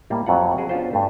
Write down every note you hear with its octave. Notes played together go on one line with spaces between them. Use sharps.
A2 G3 A#3
F2 F#3 F4 F#5
F#4 G#4 C5 G5
B3 C#4 D4 F4 F#4 C5
G2 A3